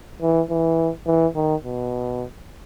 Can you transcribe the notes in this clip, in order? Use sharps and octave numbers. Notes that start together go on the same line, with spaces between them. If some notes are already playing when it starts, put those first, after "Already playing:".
E3
E3
E3
D#3
B2